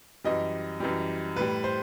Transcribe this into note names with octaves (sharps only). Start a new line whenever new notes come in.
F#2 E3 G3 D#5
F#2 E3 G3
A2 G3 B4
C5